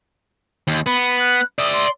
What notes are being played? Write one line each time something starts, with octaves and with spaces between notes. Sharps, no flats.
D#2
B3 B5
F#6
D5 E5 D#6
C6